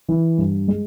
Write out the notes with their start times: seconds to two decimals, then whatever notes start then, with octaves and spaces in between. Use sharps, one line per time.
0.09 E3
0.38 G2
0.68 G#3